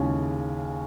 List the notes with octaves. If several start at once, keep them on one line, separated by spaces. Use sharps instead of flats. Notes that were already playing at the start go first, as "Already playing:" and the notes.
Already playing: D#2 C#3 G#3 C#4 E4